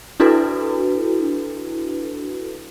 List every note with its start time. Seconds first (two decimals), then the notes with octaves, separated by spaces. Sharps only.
0.20 D4 E4 F#4 A4 B4